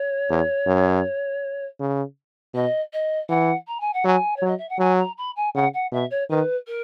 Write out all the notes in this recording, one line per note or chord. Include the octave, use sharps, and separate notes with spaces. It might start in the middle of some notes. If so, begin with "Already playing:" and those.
Already playing: C#5
E2
F#2
C#3
B2 D#5
D#5
E3 F#5
A#5
G#5
F#5
F#3 G#5
C#5
F#3
D#5
E5
F#5
F#3 G#5
A#5
B5
G#5
C#3 F#5
F#5
B2 E5
C#5
D#3 B4
A#4